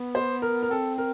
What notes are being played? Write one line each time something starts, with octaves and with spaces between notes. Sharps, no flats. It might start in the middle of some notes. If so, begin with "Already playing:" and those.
Already playing: B3
C5
A#4
A#4
C4 A4
A#4